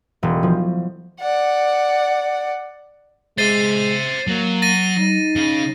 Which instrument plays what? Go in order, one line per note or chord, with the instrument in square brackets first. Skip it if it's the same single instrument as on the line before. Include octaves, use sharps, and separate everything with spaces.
[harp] E1
F3
[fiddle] D5 F#5
[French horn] G#3 [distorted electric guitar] C5 E5 [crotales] A6 C7 D#7
[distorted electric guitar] F#3 [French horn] A#3
[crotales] A6 A#6 D#7
[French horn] D#4
[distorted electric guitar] C#3 [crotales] D#7